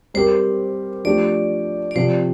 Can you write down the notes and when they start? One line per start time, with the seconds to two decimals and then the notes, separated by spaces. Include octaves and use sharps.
0.14 G3 C4 G4 A#4 C5
1.04 F3 A3 D4 G4 D5
1.91 D5
1.95 C3 F3 C4 C5